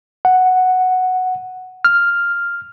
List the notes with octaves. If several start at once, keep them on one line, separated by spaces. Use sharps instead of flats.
F#5
F6